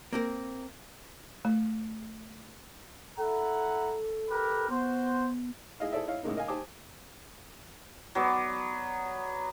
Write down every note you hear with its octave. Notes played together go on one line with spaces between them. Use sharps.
A#3 C4 A#4
A3
E4 A4 F#5 A#5
G4 A#4 B4
B3 F#4 C5
E4 G#4 D#5 F5
E4 G#4 A4 C5 D5 E5
E4 C#5 D#5 F5
A2 C#3 G#3 A#3 D#4
A#4 D#5 F5 G#5
G4 C5 G#5 A5 D6 D#6
F#3 B3 D5